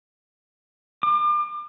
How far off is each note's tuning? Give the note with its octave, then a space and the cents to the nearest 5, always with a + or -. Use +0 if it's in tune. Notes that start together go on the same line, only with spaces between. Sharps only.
D6 +35